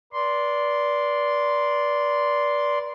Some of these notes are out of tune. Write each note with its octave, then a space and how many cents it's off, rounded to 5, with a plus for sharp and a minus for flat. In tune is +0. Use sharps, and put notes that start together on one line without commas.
B4 -40 D5 -10 C6 -5